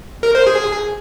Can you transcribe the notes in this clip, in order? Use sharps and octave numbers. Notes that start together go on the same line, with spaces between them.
A#4
C5
G#4